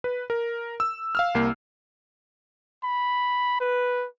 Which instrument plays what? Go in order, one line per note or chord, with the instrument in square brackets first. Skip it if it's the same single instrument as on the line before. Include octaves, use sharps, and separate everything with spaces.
[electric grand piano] B4
A#4
E6
F5 E6 F6
C2 A#3 C7
[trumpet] B5
B4